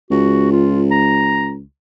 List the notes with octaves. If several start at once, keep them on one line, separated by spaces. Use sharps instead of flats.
C#2 F#4
F4
A#5